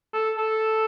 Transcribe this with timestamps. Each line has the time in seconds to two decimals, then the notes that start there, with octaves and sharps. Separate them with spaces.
0.14 A4
0.38 A4